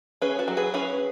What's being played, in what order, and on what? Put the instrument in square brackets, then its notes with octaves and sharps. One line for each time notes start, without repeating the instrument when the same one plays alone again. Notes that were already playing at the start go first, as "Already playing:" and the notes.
[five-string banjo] C#4 G#4 B4
F#4 A4
F#3
G#4 B4
C#4 G#4 B4